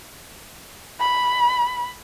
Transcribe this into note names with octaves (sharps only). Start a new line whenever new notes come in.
B5